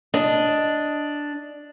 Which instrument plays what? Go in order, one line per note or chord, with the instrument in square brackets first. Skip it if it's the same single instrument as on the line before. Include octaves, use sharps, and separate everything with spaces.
[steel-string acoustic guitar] D4 [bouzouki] D#5